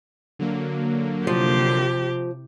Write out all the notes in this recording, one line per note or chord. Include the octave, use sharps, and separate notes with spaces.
D3 F#3 A#3
C3 F3 G4